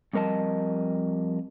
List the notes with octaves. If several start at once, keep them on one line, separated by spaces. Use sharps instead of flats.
F2 G3 A#4 D#5 A5